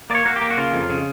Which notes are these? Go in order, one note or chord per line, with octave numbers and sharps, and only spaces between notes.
A#3 C#5 D5
A#3 F#4
G4
A#3
F#4
C#3 F4
F2
C#3